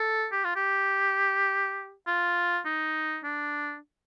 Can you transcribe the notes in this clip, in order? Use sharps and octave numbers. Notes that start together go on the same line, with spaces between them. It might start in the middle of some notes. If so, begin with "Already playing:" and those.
Already playing: A4
G4
F4
G4
F4
D#4
D4